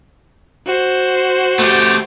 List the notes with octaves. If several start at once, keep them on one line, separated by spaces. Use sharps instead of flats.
F#4 C5
A3 G4